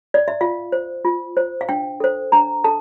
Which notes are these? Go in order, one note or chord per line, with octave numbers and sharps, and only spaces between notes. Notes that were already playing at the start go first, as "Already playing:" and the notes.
D5
E5
F4 F5
C5
F4
C5
F5
D4 G5
A4 C5
D4 A#5
A4 A5